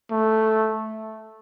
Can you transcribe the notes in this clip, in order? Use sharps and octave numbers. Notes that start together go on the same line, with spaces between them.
A3